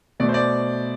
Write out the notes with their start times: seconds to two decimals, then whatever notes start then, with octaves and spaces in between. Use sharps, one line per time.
0.20 B2 A3 D5
0.29 C5
0.34 D5